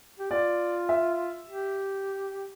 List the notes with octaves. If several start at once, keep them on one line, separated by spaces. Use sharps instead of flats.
G4
F4 D5
E5
G4